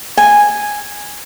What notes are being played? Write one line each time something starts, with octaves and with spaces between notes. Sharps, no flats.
G#5